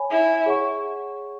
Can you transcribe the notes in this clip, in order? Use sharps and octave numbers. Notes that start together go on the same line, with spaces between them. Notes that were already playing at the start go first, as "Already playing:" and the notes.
Already playing: C#5 G#5 B5
E4
G#4 C#5 F#5 C#6